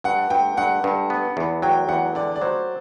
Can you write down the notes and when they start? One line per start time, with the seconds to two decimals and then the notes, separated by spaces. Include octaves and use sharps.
0.04 G2 F#5
0.30 G2 G5
0.57 G2 F#5
0.84 G2
1.10 B3
1.37 E2
1.62 F#3 G5
1.88 E2 F#5
2.15 D3 D5
2.36 D5
2.42 F#3 C5